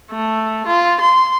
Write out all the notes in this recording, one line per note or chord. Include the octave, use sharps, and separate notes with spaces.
A3
F4
C6